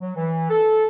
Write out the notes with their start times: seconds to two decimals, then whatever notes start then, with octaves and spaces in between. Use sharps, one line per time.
0.01 F#3
0.15 E3
0.49 A4